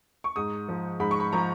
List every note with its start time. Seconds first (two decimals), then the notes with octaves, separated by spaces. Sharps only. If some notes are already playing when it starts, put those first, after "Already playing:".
0.24 C#6
0.36 G#2 D#6
0.69 F3
1.00 G#2 B5
1.11 C#6
1.20 B5
1.32 F3 A#5